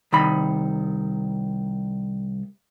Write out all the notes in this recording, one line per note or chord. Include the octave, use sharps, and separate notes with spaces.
C2 D#3 B5